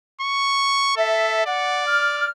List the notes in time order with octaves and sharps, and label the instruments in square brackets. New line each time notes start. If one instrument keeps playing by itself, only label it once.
[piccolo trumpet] C#6
[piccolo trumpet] A4 [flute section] E5
[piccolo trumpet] D5 [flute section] F#5
[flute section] F6